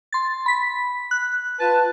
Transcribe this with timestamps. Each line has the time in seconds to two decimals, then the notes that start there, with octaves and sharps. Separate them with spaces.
0.13 C6 A6
0.46 B5 B6
1.11 F#6
1.59 F4 B4 A5